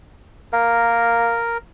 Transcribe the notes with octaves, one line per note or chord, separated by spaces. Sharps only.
A#3 A#4